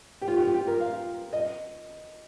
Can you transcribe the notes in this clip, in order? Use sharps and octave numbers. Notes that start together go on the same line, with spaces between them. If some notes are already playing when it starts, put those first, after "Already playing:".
G4
F4
G4
F4
G4
A#4
F5
D#5